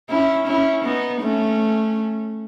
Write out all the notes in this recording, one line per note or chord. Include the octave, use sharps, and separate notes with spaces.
C#4 E4
C#4 E4
B3 D#4
A3 C#4